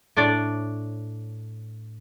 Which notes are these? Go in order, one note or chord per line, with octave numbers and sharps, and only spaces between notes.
A2 D4 C#5 D5